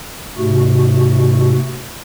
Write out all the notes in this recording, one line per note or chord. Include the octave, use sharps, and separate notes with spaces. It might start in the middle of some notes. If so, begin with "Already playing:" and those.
G#2 C3 A3 F#4